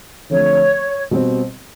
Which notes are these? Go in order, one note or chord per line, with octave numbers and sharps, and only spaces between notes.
D3 F3 A3 C4 C#5
B2 G3 C4